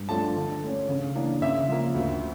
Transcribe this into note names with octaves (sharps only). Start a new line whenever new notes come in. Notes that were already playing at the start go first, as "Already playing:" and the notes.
Already playing: G2
F3 A3 D4 A5
D3
A3 C#4
C#3
E3 A#3 D4
C#3 E5
F3 A#3
D2